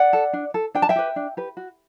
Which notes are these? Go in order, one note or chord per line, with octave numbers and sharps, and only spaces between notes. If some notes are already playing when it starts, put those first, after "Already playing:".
Already playing: D5 F#5
A4
D4
A4
D4 G5
A5
E5 G5
G4 B4
D4
G4 B4
F#4